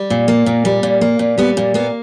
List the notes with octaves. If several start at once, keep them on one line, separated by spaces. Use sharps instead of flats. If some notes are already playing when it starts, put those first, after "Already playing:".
Already playing: G3
A#2
A#3
A#2
G3
A#2
A#3
A#2
G3 B3
A#2
A#3 B3